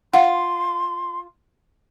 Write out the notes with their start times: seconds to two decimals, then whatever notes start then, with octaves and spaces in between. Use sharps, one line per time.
0.14 F4 F5 F#5 C6